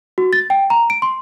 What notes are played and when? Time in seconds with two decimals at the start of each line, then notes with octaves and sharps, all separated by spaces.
0.18 F#4
0.33 A6
0.50 G5
0.70 A#5
0.90 D7
1.02 C6